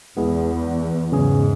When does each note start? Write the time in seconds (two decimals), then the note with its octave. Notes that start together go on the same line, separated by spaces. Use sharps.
0.17 E2 G#3 B3 E4 G#4
1.12 G#2 C#3 F#3 C#4 G#4